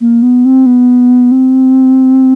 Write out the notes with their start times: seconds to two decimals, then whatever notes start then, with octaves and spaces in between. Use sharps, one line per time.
0.01 A#3
0.22 B3
0.45 C4
0.66 B3
1.31 C4